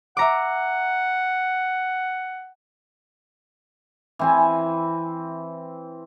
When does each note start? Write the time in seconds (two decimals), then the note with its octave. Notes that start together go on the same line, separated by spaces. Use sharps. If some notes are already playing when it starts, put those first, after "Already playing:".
0.17 E5 F#5 A#5 D6
4.19 E3 C4 G#5